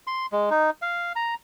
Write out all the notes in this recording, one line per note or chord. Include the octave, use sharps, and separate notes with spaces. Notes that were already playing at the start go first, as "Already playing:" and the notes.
C6
G#3
D#4
F5
A#5